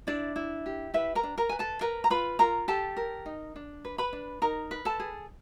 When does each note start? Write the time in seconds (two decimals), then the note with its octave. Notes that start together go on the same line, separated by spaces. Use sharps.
0.07 D4 E4 D5
0.36 E4
0.66 G4
0.94 E4 B4 E5
1.15 A#4 A#5
1.23 D4
1.38 A#4 A#5
1.49 B4 G#5
1.59 A4 A5
1.81 A#4 B4 A#5
2.04 A#5
2.10 F4 B4 B5
2.39 F4 A#4 A#5
2.68 G4 A4 A5
2.97 A#4
3.26 D#4
3.56 D4
3.85 B4
3.98 B4 B5
4.13 D4
4.42 D#4 A#4 A#5
4.71 B4
4.85 A4 A5
5.00 G#4